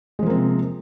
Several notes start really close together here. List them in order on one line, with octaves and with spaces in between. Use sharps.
G#3 F3 A#3 C4 C3